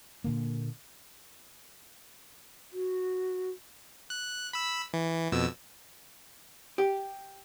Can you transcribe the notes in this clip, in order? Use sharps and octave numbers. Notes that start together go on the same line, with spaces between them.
A#2 D3 A#3
F#4
F#6
B5 E6
E3
F2 B2 E6
G4